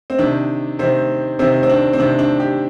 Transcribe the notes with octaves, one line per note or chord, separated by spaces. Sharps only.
C4
C3 D#3 D4
C3 D#3 C4
C3 D#3 C4
C4
D4
C4
C3 D#3 D4
D4
G4